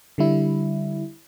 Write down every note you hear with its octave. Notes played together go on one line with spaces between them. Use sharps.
D3 G3 E4